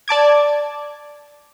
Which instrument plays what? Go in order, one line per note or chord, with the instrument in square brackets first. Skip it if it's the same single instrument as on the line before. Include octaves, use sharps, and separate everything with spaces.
[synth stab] D5 A5 D6 G#6